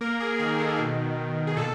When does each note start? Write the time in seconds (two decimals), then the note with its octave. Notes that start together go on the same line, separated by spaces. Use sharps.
0.01 A#3 A#4
0.20 G#4
0.39 D#3 G#4
0.59 A4
0.79 B2
1.18 B2
1.47 G#4
1.57 A#2 A4